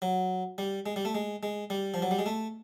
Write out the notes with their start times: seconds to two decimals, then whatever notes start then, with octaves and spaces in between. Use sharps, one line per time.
0.02 F#3
0.58 G3
0.86 G#3
0.96 G3
1.05 A3
1.15 G#3
1.43 G#3
1.70 G3
1.94 F3
2.02 F#3
2.11 G3
2.19 G#3
2.26 A3